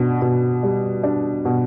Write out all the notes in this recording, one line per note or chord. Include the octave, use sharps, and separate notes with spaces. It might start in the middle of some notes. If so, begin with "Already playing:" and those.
Already playing: B2 D4
B2
G3
D4
B2